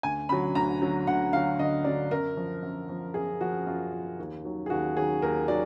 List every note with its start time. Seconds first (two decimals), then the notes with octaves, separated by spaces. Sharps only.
0.03 D2 G#5
0.29 D3 F#3 B5
0.55 D2 A#5
0.82 D3 F#3
1.07 D2 F#5
1.33 D3 F#3 F5
1.59 D2 D#5
1.84 D3 F#3 D5
2.11 F#2 A#4
2.37 F3
2.63 F#2
2.89 F3
3.14 F#2 G#4
3.41 F3 F#4
3.66 F#2 F4
3.92 F3
4.19 D#2
4.44 D#3 F#3
4.66 G#4
4.70 D#2 F#4
4.96 D#3 F#3 G#4
5.22 D#2 A#4
5.48 D#3 F#3 D5